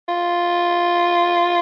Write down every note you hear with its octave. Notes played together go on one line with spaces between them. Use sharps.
F4